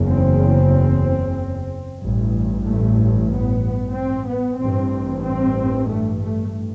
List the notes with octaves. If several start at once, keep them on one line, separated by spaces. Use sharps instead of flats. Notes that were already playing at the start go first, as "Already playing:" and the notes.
Already playing: F#1 E2 C#3
C4
A1 G2
A3
B3
C4
B3
A1 G2 C4
C4
A3
A3